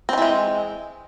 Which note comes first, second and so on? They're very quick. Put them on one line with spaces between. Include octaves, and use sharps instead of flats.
C4 D#3 E3 G#3